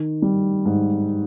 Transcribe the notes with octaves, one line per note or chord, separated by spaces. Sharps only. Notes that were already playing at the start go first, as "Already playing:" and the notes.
Already playing: D#3
G3
G#2